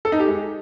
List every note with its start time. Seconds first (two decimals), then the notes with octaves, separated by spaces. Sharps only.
0.05 A4
0.12 D#4
0.20 G4
0.27 G#3